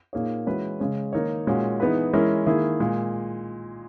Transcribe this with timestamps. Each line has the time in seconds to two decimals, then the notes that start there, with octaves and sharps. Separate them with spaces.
0.13 A#2 A#3 D#4 G#4 C#5
0.46 E3 G#3 C#4 F#4 B4
0.80 C#3 G#3 C#4
1.13 D#3 A#3 D#4 A#4 C#5
1.47 A#2 G#3 C#4 F#4
1.80 E3 B3 D#4 G#4 B4
2.13 E3 G#3 C#4 E4 A#4
2.46 D#3 A#3 E4 G#4
2.80 A#2 G#3